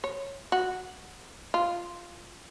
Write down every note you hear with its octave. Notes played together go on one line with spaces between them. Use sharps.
C#5
F#4
F4